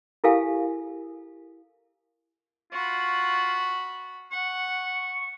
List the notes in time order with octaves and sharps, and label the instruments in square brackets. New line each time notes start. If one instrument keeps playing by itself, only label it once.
[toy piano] E4 G4 A4 A#4 F5 G#5
[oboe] F4 [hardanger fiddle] F#4 B5
[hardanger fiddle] F#5 [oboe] C#6